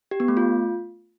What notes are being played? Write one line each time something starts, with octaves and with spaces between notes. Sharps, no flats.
G4
B3
A3
F4